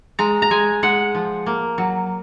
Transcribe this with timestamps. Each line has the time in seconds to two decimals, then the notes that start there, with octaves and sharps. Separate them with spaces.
0.19 G#3 A#5
0.42 A#5
0.51 G#3 G#5
0.83 G#3 F#5
1.15 F3
1.46 A#3
1.78 F#3